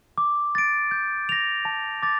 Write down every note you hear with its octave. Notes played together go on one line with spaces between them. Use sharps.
D6
A6 D7
G6
A#6 F7
A5
D6 A6